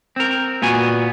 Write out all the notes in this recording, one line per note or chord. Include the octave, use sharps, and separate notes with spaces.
C4 A#4
A#2 B3 F#4 G#5